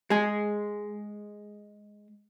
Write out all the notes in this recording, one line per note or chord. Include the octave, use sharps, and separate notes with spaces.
G#3 G#4